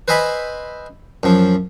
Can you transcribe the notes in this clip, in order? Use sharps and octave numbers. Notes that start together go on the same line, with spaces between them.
B4 C5 D#5 E5 G#5 B5
F#2 F3